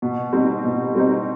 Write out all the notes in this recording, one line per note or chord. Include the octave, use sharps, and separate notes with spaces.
B2
G3 C4 D#4
B2
G3 C4 D#4